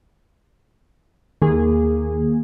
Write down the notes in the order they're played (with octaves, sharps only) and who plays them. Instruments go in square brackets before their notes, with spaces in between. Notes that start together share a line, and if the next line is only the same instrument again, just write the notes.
[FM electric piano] D#2 [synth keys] A#3 G#4